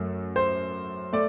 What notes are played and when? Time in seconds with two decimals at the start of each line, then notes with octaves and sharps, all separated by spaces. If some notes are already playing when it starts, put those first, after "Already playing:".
Already playing: F#2 F#3 A3
0.36 C5
1.13 A3 D5